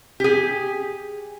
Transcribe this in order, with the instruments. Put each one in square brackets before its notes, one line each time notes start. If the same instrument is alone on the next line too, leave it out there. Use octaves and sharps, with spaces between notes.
[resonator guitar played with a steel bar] G4 G#4